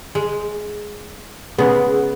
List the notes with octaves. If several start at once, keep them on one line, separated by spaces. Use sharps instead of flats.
G#3
C#3 G#3 B3 G#4